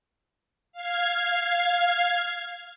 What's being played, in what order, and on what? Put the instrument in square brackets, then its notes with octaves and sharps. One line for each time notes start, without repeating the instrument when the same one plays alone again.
[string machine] F5 G#6